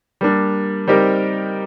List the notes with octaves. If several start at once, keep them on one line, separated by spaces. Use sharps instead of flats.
G3 A#3 D4
G3 C4 D#4 G4 A#4